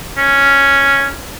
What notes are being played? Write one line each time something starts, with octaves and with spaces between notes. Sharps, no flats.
C#4